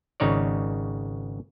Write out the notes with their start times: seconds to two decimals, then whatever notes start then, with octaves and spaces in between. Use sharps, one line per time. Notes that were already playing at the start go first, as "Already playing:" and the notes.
0.20 G#1 C#3 D#4 C#5 D5